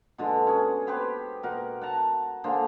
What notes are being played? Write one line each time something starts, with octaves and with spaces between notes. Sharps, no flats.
B2 D3 G#3
C#4 G#4
B3 G4 B4 C5
B2 A#4 F#5
F#5 A5 A#5
D3 A#3 G#4 C5